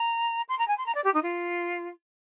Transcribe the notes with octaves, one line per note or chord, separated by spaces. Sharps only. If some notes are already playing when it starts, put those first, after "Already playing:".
Already playing: A#5
C6
A#5
G#5
C6
A#5
D5
G4
D#4
F4